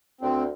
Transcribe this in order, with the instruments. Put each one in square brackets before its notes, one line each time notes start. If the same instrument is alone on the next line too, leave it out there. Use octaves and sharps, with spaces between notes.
[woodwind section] D2 [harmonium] C4